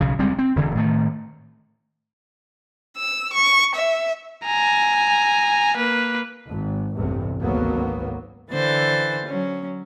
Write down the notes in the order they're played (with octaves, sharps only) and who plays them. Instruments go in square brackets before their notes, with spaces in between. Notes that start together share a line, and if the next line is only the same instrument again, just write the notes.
[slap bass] B1 C#3
D2 G3 G#3 C4
C4
E1 D3 E3
A2 D#3 A3
[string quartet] E6
C#6
E5
[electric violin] G#5 A#5
A#3 B4
[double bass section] G#1
A1 E2 G2 C3
G#1 D2 F#3 A#3 B3
[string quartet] D3 E3 C5 A6
F#3 C#4